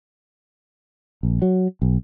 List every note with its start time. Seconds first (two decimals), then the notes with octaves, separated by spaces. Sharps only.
1.23 A#1
1.42 F#3
1.82 B1